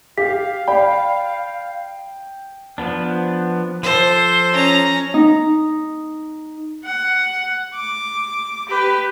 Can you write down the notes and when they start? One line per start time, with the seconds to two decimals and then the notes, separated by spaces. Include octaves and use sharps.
0.17 G4 F5 B6
0.68 D5 G5 B5
2.78 F3 B3 D4
3.83 F3 A4 C5
4.53 C#4 A#5
5.14 D#4
6.85 F#5
7.75 D6
8.69 G4 B4